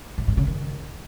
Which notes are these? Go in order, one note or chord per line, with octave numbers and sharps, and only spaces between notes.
A2
G2
C#3
D#3